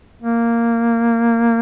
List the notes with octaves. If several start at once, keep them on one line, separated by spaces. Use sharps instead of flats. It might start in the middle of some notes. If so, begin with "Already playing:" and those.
A#3